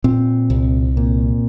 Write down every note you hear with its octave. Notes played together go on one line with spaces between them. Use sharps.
A#2 C4
C2
A#2